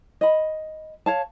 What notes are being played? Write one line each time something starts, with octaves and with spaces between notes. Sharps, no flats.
D#5 B5
C#5 F5 A5